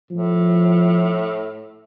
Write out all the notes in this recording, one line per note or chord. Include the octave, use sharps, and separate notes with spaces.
A2 F3